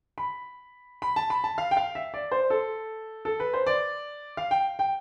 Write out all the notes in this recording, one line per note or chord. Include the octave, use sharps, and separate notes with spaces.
B5
B5
A5
B5
A5
F5
G5
F5
E5
D5
C5
A4
A4
B4
C5
D5
F5
G5
G5